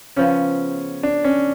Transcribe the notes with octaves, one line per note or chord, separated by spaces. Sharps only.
C#3 F3 B3 C#4
D4
C#4